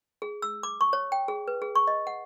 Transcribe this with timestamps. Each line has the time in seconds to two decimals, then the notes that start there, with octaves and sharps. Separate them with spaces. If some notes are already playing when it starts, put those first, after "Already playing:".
0.22 G#4
0.42 E6
0.63 D6
0.81 C#6
0.93 C#5
1.12 G5
1.28 G#4
1.48 B4
1.62 G#4
1.75 C#6
1.87 D#5
2.07 F#5